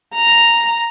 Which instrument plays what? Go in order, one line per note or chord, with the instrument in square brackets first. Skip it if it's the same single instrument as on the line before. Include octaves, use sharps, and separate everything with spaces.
[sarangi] A#5